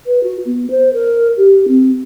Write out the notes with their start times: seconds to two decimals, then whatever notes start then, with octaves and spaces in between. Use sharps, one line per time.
0.06 B4
0.23 F#4
0.46 B3
0.70 C5
0.93 A#4
1.37 G4
1.68 C4